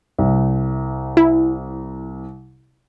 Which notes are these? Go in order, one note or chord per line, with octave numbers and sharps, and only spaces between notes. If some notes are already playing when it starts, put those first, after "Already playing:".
C2
E4